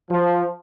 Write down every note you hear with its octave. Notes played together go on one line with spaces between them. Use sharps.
F3